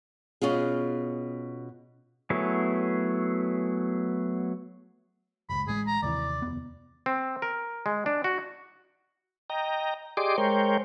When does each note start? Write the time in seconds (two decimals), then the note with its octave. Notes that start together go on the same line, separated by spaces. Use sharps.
0.42 B2 C#4 F4 G#4
2.30 F#3 A3 B3 E4 G#4
5.49 F#1 C#2 B5
5.68 A1 G#3 G#4
5.87 A#5
6.03 D#2 C3 E3 D5
6.42 F1 D#2 B3
7.06 C4
7.42 A#4
7.86 G#3
8.06 D4
8.24 F#4
9.50 D#5 G5 A#5
10.17 G4 G#4 D5 D#5 C6 D6
10.38 G#3 A#4 C5 C#5 G5